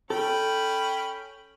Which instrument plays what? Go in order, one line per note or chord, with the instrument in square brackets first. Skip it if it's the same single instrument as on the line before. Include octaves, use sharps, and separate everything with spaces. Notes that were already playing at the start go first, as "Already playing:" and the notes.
[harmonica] C#4 G5 B5 [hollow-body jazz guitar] A4